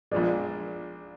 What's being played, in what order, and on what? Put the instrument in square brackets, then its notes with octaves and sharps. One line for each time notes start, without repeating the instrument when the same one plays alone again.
[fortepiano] A#1 A#2 F3 G#3 [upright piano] D5